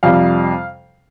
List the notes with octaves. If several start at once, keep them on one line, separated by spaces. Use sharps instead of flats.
F2 C3 G3 F5